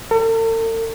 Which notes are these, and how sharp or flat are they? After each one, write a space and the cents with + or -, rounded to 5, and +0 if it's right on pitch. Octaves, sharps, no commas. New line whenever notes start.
A4 +45